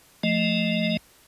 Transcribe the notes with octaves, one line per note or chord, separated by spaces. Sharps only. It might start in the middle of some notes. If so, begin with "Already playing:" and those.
F3 A3 D#5